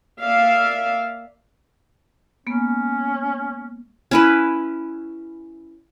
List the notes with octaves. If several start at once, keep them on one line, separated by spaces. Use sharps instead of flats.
A#3 D5 E5 F5
G#3 A#3 B3 C#4
C#4 E4 B4